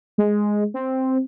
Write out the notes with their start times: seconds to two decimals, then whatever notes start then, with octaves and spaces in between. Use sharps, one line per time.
0.18 G#3
0.74 C4